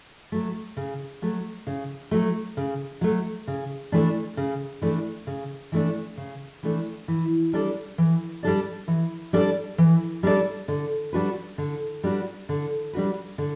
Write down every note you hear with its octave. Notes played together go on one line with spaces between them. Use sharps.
F#3 A3
C#3
F#3 A3
C#3
F#3 A3
C#3
F#3 A3
C#3
E3 A3 D4
C#3
E3 A3 D4
C#3
E3 A3 D4
C#3
E3 A3 D4
E3
G3 D4 A4 D5
E3
G3 D4 A4 D5
E3
G3 D4 A4 D5
E3
G3 D4 A4 D5
D3
G3 D4 F#4 B4
D3
G3 D4 F#4 B4
D3
G3 D4 F#4 B4
D3